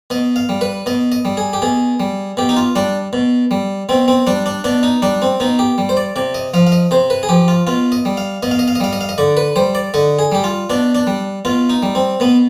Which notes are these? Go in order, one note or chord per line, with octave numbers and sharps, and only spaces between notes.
B2 D#5
F5
G3
B4
B2 D#5
D#5
G3
G#4
G4
B2 G#4
G3
B2 G4
D#4
F4
G3 D4
B2
G3
B2 C4
C4
G3 D4
D4
B2 D4
D#4
G3 D4
C4
B2 D#4
G4
G3
C5
D5
C3 D5
D#5
F3 F5
F5
D#5
C3 C5
B4
G#4
F3 G4
F4
B2 F4
D#5
G3
F5
B2 D#5
F5
D#5
F5
D#5
G3 F5
D#5
F5
D#5
D3 D5
B4
G3 C5
D5
D3 D#5
G#4
G3 G4
F4
B2 D4
D4
G3
B2 F4
D#4
G3
C4
B2 B3